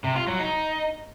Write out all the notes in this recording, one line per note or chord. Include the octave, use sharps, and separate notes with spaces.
C3
F4
F#3
D#4